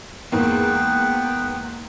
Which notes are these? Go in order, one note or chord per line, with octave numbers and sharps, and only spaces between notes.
E2 G#2 A#3 B3 B4 G5